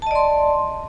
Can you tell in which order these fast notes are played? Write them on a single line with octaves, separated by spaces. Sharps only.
A5 D#5 D5 C6